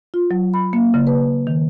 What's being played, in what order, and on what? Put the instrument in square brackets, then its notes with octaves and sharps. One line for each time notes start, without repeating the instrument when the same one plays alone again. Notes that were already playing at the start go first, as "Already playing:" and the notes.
[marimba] F4
F#3
B5
A#3
C#3
B4
D#3